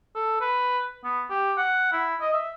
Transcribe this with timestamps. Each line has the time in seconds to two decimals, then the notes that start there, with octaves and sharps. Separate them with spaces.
0.15 A4
0.41 B4
1.04 B3
1.30 G4
1.57 F#5
1.92 E4
2.21 D#5
2.33 E5